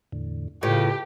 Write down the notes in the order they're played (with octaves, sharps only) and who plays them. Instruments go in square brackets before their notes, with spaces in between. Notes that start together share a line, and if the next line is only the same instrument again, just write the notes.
[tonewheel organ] E2 A2 D3
[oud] A2 [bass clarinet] C#3 [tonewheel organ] F4 B4 [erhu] G4